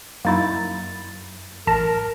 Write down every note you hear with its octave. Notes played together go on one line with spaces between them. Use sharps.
F#2 A#3 D#4 E4 A6
A1 A#4 A5 A#6